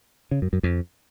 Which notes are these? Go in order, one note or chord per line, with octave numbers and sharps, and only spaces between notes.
C#3
F#2
F#2
F2